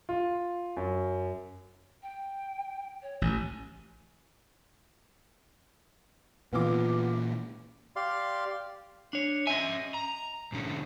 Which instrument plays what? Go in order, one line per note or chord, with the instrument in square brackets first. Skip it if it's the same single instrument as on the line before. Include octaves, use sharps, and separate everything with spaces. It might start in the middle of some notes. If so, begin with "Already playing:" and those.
[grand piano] F4
F#2
[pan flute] G5
C#5
[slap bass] A1 [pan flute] G#5
[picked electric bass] A#2 E3 [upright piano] B3 F4 D6
[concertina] G4 D5 F5 C6
[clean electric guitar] D4 C#5
[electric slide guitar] C#4 E5 [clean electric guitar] D#5 G#5
[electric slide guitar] A#5
G#2 D3 C#4